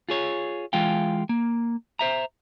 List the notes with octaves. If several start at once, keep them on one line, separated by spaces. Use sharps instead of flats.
F4 G#4 C#5
E3 G#3 F4 F5 G5
A#3
C5 E5 A#5